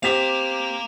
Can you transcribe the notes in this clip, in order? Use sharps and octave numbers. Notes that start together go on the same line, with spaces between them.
C4 G4 F5 A#5 D6 B6 E7 F7